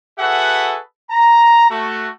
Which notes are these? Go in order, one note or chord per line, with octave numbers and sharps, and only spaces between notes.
F#4 G#4 A4 B4 E5 F#5
A#5
A3 F#4